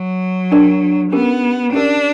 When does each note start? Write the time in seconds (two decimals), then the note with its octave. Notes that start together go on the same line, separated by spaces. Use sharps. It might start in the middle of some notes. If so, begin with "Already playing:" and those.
Already playing: F#3
0.52 D4 A#4 D5
1.12 B3 C#4 G4 A#4
1.73 C#4 D4 G4 A#4